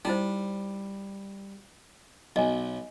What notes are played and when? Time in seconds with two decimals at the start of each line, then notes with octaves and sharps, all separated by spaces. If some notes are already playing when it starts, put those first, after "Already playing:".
0.05 G3 D#4 E4 C5
2.36 B1 D#5 G#5